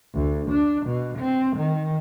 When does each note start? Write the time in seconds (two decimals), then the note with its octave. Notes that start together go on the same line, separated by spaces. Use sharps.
0.14 D2
0.51 D4
0.87 B2
1.19 C4
1.57 D#3